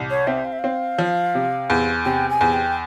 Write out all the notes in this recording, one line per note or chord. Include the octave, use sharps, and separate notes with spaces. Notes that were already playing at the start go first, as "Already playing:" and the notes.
Already playing: C2
C#5
C4 E5
F5
E5
C4 F5
F3
C3
E2
C3 G5
G#5
E2
G5